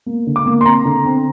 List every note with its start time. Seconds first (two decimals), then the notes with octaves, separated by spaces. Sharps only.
0.06 A#3
0.27 D3
0.36 D6
0.46 A#3
0.61 C6
0.65 C4 A#5
0.85 D3
1.05 C4